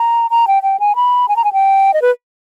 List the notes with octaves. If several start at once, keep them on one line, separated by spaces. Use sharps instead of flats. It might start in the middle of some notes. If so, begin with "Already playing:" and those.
Already playing: A#5
A#5
G5
G5
G#5
B5
G#5
A#5
G#5
G5
D#5
B4